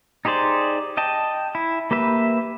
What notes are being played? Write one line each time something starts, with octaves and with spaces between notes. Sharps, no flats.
D#4 G4 G#4 C5 D5
D#5 G5 A5
E4
A#3 G4 B4 E5